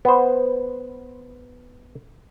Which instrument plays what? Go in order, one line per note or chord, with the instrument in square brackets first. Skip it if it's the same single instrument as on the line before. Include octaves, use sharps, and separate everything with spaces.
[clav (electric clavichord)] B3 C5